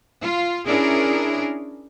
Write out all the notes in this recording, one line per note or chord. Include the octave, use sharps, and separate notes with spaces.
F4
C#4 D4 E4 G#4 A#4